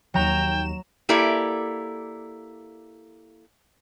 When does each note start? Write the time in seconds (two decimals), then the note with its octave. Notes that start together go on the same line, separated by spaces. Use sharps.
0.14 D#2 F#3 G5 A#5 E7
1.09 A#3 E4 G4 A4 D5